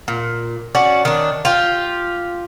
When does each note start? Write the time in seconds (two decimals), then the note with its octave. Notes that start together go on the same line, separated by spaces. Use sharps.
0.08 A#2
0.75 C#4 F#4 D5
1.05 D#3 D4
1.45 F4 G4